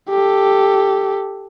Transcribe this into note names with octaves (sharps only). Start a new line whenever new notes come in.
G4 A4